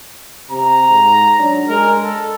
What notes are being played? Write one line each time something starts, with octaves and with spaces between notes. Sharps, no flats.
C3 A#5
G#2
F#3 D4
G#3 A#4
A4